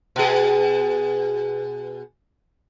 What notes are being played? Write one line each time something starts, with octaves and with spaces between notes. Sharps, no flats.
B2 G#4